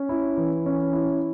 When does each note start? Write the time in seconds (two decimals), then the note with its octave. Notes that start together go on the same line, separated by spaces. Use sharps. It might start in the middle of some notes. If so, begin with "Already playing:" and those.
Already playing: C#4
0.09 E4
0.37 E3
0.66 C#4
0.93 E4